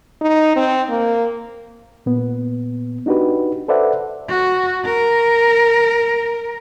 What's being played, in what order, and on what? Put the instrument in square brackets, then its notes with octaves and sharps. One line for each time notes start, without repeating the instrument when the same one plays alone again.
[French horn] D#4
C4
A#3
[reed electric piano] A#2 B3
D4 D#4 F#4 G4 B4
A4 B4 C5 D5 E5 F#5
[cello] F#4
A#4